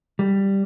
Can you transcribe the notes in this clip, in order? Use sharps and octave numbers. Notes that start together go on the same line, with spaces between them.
G3